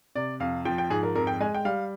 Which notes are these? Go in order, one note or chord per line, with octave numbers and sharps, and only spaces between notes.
C3 D5
F2 F5
F3 G5
G5
G#2 G#4
A#4
F2 A#4
G5
G#3 G#5
G5
G3 F5